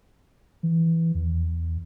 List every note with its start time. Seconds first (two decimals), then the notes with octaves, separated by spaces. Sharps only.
0.63 E3
1.15 E2